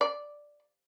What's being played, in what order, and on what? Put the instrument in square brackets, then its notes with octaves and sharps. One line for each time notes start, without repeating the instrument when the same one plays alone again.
[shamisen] D5